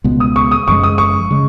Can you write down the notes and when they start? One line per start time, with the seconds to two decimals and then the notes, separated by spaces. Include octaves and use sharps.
0.04 C#2 B2 G#3 B3
0.20 D#6
0.36 C#6
0.51 D#6
0.68 F#1 F#2 F3 G#3 C#6
0.84 D#6
0.98 C#6
1.31 C#3 G#3